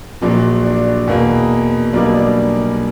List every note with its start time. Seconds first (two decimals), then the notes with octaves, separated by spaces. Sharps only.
0.22 A#1 A#2 F#3
0.64 D4
1.07 E2 B2 A#3
1.93 B1 B2 G3 A#3 D4
2.14 D4